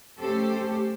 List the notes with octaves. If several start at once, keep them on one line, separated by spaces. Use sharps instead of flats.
A3 C#4 G4 A4 C5